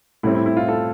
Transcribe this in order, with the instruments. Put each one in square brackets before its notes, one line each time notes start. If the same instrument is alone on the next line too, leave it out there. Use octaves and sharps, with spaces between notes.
[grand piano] A2 G3 C4 E4
E4
E4
F4
F4 A4